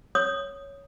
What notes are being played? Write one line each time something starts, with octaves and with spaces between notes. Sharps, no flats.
C#5 D#6